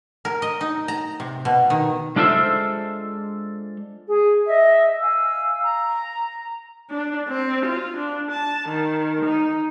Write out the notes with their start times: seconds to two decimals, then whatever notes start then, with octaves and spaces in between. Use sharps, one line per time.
0.25 A#4
0.42 D#5
0.61 D#4
0.88 A#5
1.20 C3
1.45 B2
1.70 D#3
2.16 G#3 D4 F4 A4 C5 E5
4.07 G#4
4.46 D#5 E5
4.99 F5 G#5 E6
5.61 A#5
6.90 D4
7.29 C4
7.66 F4
7.97 D4
8.31 A5
8.69 D#3
9.25 D#4